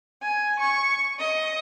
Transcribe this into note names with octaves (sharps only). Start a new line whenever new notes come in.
G#5
C#6
D#5